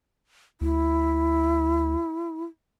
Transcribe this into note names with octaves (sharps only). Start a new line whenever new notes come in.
D2 E4